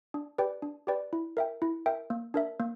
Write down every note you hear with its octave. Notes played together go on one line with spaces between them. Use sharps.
D4
G4 B4 D5 G5
D4
G4 B4 D5 G5
E4
A#4 E5 G5
E4
A#4 E5 G5
A#3
D4 A#4 E5
A#3